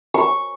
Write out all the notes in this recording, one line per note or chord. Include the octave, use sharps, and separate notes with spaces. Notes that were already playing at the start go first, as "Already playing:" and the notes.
C#6